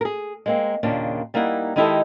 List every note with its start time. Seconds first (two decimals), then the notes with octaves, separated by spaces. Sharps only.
0.01 G#4 A#4
0.46 G#3 A#3 C4
0.83 D#2 A#2 C#3 D4
1.34 G3 A#3 D#4 E4 F#5
1.76 D#3 G#3 D#4 E4 G4 A4